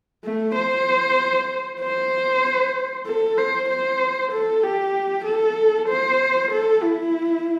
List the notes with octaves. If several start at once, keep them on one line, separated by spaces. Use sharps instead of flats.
A3
C5
C5
A4
C5
C5
A4
G4
A4
C5
A4
E4